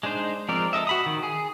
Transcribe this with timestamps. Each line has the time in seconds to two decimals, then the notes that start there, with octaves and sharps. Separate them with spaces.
0.03 G#3 D4 D#4 C5
0.48 F3 G#3 C4 A#4 D5
0.73 A4 D#5 E5
0.87 F#4 B5 D#6
1.06 D#3
1.23 G#4